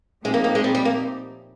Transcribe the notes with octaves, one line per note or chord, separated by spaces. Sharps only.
A#2 F3 G#3 C4 D#4 G4
A#3
A#3
G#3
G3
G3
A#3